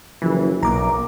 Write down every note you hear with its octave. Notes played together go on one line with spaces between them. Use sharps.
F#1 E3 F3
B1 A#3 A#5 D6